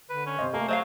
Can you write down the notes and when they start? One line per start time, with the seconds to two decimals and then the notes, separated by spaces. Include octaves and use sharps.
0.10 D3 B4
0.27 C#4
0.39 C3 C5 D#5
0.53 A3 A#3 A4 G#5 A#5
0.68 F#3 C5 D#5 F5